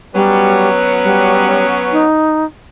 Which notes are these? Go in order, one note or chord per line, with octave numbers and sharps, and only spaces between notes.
F#3 G3 B3 C#4
G3
D#4